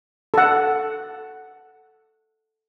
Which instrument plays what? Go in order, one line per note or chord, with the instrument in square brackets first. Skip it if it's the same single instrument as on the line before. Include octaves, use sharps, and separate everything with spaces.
[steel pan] A4 F#5